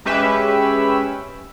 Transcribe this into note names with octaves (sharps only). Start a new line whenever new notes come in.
G#3 C#4 G4 B4 E5